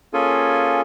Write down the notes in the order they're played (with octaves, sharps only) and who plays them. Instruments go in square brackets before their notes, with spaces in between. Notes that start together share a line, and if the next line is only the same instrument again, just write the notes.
[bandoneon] A#3 C#4 F4 G#4 A4 G#5